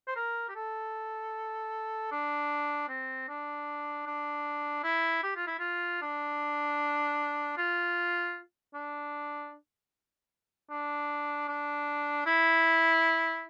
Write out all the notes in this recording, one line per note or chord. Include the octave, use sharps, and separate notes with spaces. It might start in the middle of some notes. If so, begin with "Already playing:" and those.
C5
A#4
G4
A4
D4
C4
D4
D4
E4
G4
F4
E4
F4
D4
F4
D4
D4
D4
E4